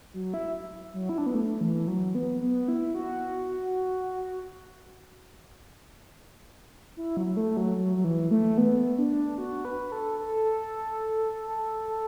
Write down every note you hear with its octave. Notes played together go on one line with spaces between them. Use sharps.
F#3
E4
F#3
E4
D4
B3
A3
E3
F#3
B3
B3
E4
F#4
E4
F#3
F#3
A3
F#3
F#3
F#3
E3
A3
B3
D4
F#4
B4
A4
A4